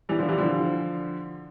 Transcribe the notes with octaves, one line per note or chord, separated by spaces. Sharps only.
E3 G3
D3 F3
E3 G3
D3 F3